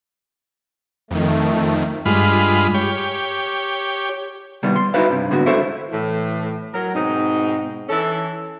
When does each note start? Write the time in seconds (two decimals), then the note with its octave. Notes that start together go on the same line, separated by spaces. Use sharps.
1.11 F2 D#3 A3
2.06 G2 G#3 F4 B5
2.74 G4 C#5
4.63 C2 B2 D#3 G3 B3
4.76 C6
4.94 D#4 E4 F#4 B4 F5
5.10 G2 C3
5.31 G#2 D3 B3 F#4
5.46 E4 F#4 A4 C5 E5
5.92 A2 E3
6.74 F#3 A#4
6.95 G#2 B2 C4 D#4
7.89 E3 C#4 A4